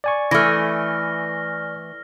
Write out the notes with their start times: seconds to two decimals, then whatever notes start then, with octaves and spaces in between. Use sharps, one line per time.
0.04 D5 G#5 C#6
0.31 E3 A3 F6 A#6